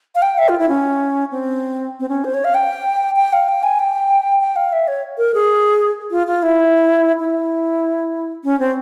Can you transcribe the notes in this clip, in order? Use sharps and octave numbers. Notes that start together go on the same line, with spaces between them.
F5
G5
E5
F4
E4
C#4
C4
C4
C#4
C5
C#5
F5
G5
G5
F5
G5
G#5
G5
G5
F5
E5
C#5
A#4
G#4
F4
F4
E4
E4
C#4
C4